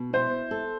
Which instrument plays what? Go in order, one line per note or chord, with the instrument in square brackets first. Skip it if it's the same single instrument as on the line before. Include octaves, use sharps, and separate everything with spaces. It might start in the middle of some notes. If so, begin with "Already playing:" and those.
Already playing: [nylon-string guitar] B2
[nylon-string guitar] E4 [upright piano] C5
[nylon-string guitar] A4